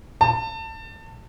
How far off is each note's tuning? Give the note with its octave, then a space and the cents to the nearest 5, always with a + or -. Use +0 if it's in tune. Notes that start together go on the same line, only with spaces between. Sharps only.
A5 +25